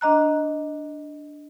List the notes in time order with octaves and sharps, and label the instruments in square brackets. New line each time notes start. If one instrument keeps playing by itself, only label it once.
[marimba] D4 D#5 A#5 F#6